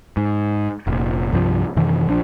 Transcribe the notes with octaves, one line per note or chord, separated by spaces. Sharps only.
G#2
F1 A#2
C2 G2 C3 F3
F#2 C3 D#3 E3
A#1 F3 D4